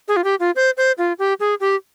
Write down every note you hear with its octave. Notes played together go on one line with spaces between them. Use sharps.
G#4
F4
G4
F4
C5
C5
F4
G4
G#4
G4